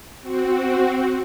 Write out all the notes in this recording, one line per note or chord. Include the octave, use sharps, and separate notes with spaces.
C4 F#4